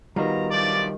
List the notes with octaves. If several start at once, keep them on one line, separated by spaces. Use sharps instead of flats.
D#3 G3 B3 F4 F#4 A#5
B1 G2 F3 A3 D5